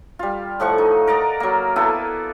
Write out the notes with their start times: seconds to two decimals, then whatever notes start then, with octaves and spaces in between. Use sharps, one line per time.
0.19 G3 F4
0.60 A2 F3 F#5 C#6
0.78 D#4
1.07 A#4 D5 D#5 A#5
1.40 F#3 A#3
1.76 A#3 B3 E4 A4